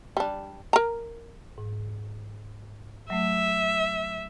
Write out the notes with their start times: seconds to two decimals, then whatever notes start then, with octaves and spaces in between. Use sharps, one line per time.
0.17 G3 D4
0.73 A#4 A#5
1.58 G#2
3.10 F#3 A3 E5